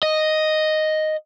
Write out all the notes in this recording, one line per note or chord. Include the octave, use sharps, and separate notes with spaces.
D#5